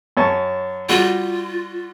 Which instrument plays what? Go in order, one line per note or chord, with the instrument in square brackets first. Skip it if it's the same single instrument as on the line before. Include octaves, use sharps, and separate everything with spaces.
[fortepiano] F#2 C#5 A5
[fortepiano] G3 F#4 [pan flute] F4